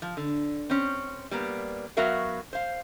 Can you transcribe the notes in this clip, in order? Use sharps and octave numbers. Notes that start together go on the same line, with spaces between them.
F3
D3
C4 C#4
G3 A#3 B3
F#3 B3 F#4 A#4 E5 F5
C5 F5